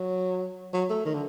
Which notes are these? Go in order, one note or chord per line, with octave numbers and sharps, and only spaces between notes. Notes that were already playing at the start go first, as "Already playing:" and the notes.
Already playing: F#3
F#3
A3
D#3
D3